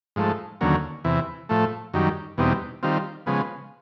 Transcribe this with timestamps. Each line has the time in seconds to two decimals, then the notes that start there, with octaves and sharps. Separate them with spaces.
0.16 G#2 F3 A3
0.61 D#2 D3 F#3 A#3 C#4
1.04 E2 C3 E3
1.49 A2 F3 A3
1.94 F#2 D#3 G3
2.38 E2 B2 G3 C4 D#4
2.83 D#3 G3 C4 F4
3.26 C#3 F3 G#3 B3